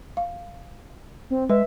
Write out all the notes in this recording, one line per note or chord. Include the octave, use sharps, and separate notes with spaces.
F5
C4
G#3 B4 E5